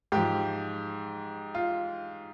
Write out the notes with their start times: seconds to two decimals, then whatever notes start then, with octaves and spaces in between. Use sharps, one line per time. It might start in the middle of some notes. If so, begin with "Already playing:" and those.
0.12 G#2 F3 G4
1.55 F4